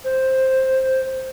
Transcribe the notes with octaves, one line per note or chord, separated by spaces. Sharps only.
C5